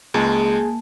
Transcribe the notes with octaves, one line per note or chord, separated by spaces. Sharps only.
C#2 G#3 A#3 G#4 G#5 A5